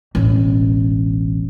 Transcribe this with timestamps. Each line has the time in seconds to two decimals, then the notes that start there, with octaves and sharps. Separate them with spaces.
0.15 E1 A1